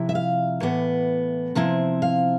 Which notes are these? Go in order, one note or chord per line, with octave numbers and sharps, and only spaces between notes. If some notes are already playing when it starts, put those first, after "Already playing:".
Already playing: C3 F3 E4
E5
F5
A2 E3 B3
C3 F3 C4 E4
F5